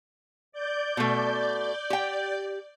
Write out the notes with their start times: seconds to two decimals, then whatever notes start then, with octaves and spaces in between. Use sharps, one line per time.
0.52 D5 G6
0.97 B2 A3
1.90 G4 G5